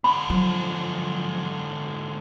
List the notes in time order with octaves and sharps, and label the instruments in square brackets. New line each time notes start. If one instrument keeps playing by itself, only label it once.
[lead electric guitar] G#2 D3 [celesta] B5
[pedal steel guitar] F3 [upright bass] F#3